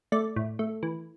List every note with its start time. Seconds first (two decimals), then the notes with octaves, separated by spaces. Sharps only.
0.12 A3 D5
0.36 A2
0.59 A3
0.83 E3